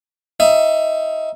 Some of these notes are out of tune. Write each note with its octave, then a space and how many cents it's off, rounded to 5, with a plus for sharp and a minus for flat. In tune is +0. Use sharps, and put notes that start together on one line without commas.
D#4 +20 E5 +20